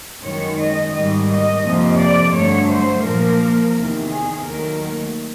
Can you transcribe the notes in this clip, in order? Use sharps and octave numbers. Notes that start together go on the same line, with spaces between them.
F#2 D#3 G#3 C#5
D#5
G#2 D#3 G3 D#5
D#5
F2 C3 F3 A#3
D5
G2 D3 F#3 A3 C#5
C5
A#2 F3 A#3 A#4
E2 C3 D#3
G#4
D#2 D#3 F#3 A3 A#4